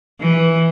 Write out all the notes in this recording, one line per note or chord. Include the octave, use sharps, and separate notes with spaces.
E3